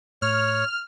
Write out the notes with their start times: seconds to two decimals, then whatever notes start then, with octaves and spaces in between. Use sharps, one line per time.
0.22 A2 C#5 F6